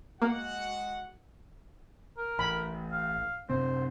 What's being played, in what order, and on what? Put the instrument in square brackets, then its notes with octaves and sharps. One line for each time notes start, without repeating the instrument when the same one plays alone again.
[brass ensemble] G#3 F#4 F#5 [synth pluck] A#3
[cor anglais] A#4
[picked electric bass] A1 [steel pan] B5
[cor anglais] F5
[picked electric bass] F#2 C3 C4 [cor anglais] C5